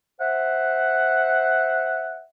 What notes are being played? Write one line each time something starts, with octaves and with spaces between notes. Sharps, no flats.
C5 E5 F#5